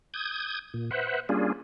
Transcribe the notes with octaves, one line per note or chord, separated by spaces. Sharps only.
D#6 G6 G#6
A#2
B4 C5 E5 F#5
G3 A#3 C#4 D4 F4 G#4